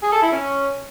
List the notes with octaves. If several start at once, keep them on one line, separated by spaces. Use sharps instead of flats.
G#4
A4
E4
C#4